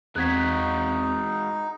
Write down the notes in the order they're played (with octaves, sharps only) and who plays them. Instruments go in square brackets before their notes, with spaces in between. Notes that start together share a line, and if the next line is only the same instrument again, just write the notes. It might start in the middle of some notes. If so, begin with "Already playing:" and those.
[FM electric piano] E2 C4 [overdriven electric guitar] G#3 F#4 [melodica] D#4 [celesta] F#6 G#6 B6